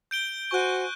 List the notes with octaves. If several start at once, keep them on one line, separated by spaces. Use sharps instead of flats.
G6 D7 G7
F#4 C5 G#5 C#6 F#6